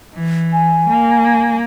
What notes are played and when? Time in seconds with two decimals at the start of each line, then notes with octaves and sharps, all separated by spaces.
0.13 E3
0.53 G#5
0.88 A#3